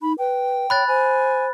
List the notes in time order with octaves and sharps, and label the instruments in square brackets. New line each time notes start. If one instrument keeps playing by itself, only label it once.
[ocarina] D#4 [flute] B5
[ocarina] B4 [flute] G5
[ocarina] C#5 [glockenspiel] B5 F#6 A6
[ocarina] C5 [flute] G#5